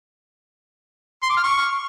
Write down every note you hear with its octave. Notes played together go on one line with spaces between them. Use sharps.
C6
D6
F6
C#6